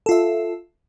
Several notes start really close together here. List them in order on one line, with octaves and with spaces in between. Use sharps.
A4 F4 E5